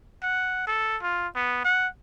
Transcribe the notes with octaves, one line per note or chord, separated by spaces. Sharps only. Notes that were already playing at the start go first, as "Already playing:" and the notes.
F#5
A4
F4
B3
F#5